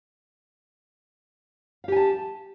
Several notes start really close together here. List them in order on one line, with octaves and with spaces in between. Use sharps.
F5 G4 G#5 A5